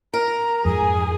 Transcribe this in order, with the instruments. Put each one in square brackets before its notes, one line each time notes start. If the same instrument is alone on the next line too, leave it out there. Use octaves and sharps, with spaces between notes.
[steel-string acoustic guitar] A#4 [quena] A#5
[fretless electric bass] F2 G#2 [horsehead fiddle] G#4 G#5 [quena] D#6